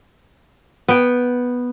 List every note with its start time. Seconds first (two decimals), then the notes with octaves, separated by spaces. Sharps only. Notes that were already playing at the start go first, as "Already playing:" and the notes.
0.89 B3 G5